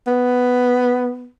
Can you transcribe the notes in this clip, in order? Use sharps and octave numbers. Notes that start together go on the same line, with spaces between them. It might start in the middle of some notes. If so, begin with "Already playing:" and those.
B3